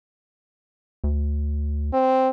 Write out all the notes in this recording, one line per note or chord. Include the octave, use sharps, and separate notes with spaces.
D2
C4